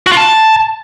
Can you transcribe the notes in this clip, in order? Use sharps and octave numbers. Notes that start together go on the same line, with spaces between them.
F#4
F4
A5